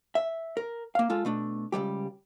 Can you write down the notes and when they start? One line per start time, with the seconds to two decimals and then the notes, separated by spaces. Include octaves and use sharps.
0.15 E5
0.57 A#4
0.95 A#3 F5
1.10 G#3 F4 A4
1.25 B2 A3 D4
1.72 C#2 F#2 G3 G4